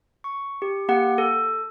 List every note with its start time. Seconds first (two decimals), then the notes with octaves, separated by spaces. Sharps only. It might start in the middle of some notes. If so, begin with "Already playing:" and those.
0.24 C#6
0.62 G4
0.89 A#3 G4 F#5
1.18 A4